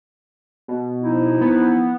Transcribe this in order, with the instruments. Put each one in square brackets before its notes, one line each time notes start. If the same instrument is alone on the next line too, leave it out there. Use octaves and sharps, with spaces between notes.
[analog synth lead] B2
[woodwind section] F3 D#4 E4
[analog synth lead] B3